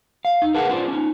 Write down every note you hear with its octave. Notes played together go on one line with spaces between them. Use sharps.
F5
D#4
G#4 A#4 B4 F#5 A5
C#4 D4 F4 C5 D5
C#4 D#4